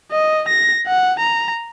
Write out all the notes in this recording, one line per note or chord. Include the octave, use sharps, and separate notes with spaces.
D#5
A#6
F#5
A#5